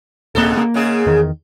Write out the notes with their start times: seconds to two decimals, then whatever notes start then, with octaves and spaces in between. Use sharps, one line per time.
0.35 D#1 G#2 B2 A#3 A4
0.57 A#3
0.74 G#2 C#3 G#4
1.06 E2 D#3